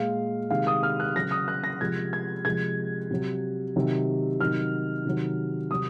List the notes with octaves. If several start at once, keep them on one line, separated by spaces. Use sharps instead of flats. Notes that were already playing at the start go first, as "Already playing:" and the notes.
Already playing: A#2 G#3 F5
C3 D#3 G#3 F5
D#6
F6
F#6
C#3 F#3 A#6
D#6
F#6
A#6
C3 F3 G#3 G#6
G#6
C3 F3 G#3 G#6
C3 F#3
C3 D#3 F#3
C3 D#3 F#3 F6
C3 D#3 F#3
C3 F#3 D#6